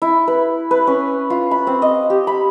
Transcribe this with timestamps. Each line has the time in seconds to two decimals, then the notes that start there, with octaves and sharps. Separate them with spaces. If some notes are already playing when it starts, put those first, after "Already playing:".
0.02 E4
0.28 B4
0.71 B4
0.87 C#4
1.30 F4
1.51 B5
1.67 C4
1.82 D#5
2.10 G4
2.27 B5